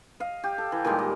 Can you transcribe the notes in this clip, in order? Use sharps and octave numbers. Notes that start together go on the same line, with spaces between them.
D#5 F5
G4
A4
E3
A#2 D#3 G3 G#3
D#5